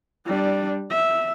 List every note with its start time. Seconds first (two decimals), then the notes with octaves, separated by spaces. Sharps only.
0.26 G3 D4
0.91 E5